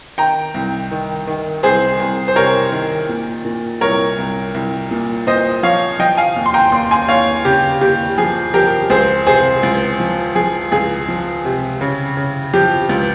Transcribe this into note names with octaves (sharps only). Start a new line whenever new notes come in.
D#3 G5 A#5
C2
D#3
D#3
C2 G#4 C5
C2
C5
C3 A#4 C#5
D#3
A#2
A#2
C2 A#4 C#5
C2
C2
A#2
A#2 C5 D#5
F3 C#5 F5
F3 D#5 G5
F5 G#5
D#2
C6
G5 A#5
D#2 C6
G#5 C6
D#2 C#5 F5
C#3 G4
D#2 G4
F3 G#4
F3 G4 A#4
C#2 G#4 C5
C3 G#4 C5
C#2
F3
F3 G#4
C#2 G#4
F3
C3
C#3
C#3
F3 G4
C#2